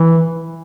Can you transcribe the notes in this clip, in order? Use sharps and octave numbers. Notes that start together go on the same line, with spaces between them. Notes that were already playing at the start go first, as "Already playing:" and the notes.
Already playing: E3